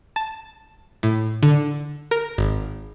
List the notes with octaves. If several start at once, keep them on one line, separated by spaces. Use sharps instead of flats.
A5
A2
D3
A#4
G#1